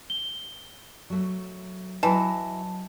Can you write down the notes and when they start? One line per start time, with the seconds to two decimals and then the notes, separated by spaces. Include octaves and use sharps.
0.10 G7
1.10 F#3 A3
2.03 E3 F#3 D#5 A5